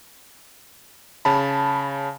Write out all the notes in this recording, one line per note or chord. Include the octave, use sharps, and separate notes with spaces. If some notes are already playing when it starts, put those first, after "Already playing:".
C#3 A5 B5